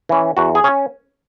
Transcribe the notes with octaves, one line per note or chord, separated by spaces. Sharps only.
E3 C#4
E2 F#4
G#4
C#4